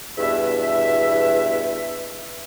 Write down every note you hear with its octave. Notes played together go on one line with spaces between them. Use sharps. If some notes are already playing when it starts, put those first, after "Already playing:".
E2 G2 B2 E5